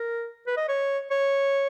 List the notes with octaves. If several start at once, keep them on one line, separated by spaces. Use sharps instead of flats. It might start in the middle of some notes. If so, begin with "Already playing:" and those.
Already playing: A#4
B4
D#5
C#5
C#5